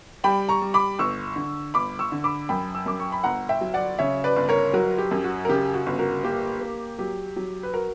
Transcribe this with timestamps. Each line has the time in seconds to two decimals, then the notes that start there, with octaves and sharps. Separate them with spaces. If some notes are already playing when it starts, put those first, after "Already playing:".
0.24 G3 G5 B5
0.49 A#5 C#6
0.62 G3
0.74 B5 D6
0.99 G1 C#6 E6
1.36 D3
1.74 G1 B5 D6
1.99 C#6 E6
2.12 D3
2.24 B5 D6
2.49 F#2 G5 B5
2.75 E6
2.86 F#2 D6
3.00 C#6
3.12 B5
3.24 G1 F#5 A#5
3.49 E5 G5
3.61 F#3
3.74 D5 F#5
3.99 C#3 C#5 E5
4.24 B4 D5
4.36 G1
4.49 A#4 C#5
4.73 F#3 F#4 A#4
4.98 G4
5.11 F#2
5.24 F#4
5.45 A#4
5.49 C#3 G4
5.74 F#4
5.86 G1
5.99 F#4 A#4
6.23 A#3 G4
6.61 A#3
6.98 F#3 G4
7.36 F#3
7.63 B4
7.74 F#4 A#4